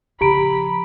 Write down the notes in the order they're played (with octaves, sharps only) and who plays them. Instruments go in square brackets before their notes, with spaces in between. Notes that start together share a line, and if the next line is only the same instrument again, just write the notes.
[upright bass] C#3 F3 [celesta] G4 A#5 D7 [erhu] B5